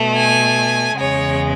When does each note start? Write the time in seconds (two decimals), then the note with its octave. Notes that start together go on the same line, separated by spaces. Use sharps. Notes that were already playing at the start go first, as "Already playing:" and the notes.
Already playing: B2 A3
0.16 G#5
0.99 E2 C#3 G#3 C#5